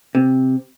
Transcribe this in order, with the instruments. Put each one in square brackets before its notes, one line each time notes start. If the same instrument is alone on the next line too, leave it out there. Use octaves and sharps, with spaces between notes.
[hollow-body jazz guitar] C3